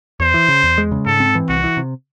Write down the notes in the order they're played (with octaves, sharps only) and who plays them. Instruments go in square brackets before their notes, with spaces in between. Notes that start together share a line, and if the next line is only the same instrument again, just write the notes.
[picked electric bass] E2 [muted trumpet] C5
[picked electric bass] E3
C#3
E2
G#3
C#3
[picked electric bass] G#2 [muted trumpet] A4
[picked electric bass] C4
E3
[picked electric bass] C2 [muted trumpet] F#4
[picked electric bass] E3
C3